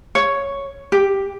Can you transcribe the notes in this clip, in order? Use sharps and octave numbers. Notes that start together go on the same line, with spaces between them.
C#5
G4